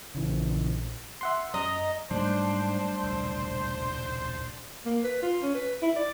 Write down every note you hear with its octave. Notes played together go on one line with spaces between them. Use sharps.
A#1 C#3 E3
E5 F#5 C6
F#2 D#5 A#5
G#2 F#3 G3 A3 D4 C5
D#1 B1
A#3
B4
F4
C#4
B4
E4
D5